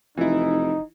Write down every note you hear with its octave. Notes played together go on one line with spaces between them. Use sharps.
F1 E3 D#4 E4